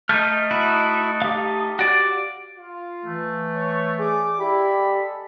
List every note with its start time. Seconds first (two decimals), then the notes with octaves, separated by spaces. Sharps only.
0.09 A3 D#4 F6 G6
0.51 E4 F#4
1.22 G4 F5
1.79 F#4 D5
2.57 F4
3.04 E3 A3
3.54 C#5
3.99 G#4 A4 D5 D6
4.39 E4 G4 D5 B5
4.77 G#3 A4